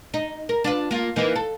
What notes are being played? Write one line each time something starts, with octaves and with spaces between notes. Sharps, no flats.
D#4
A#4
D4 F4 B4
A#3 F4
E3 A#3 D#4
A4